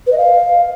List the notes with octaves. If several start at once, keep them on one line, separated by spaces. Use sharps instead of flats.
B4
D#5
F5